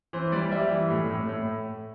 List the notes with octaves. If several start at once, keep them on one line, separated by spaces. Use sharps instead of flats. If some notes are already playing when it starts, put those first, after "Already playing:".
E3 C5
G3 D5
G3 E5
E3
A2
A2
A2